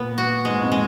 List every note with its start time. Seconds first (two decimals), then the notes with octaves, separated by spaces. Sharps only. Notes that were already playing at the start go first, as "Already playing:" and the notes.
Already playing: A#2 B3
0.18 F#4
0.45 G#2 G#3
0.61 F2
0.72 G#3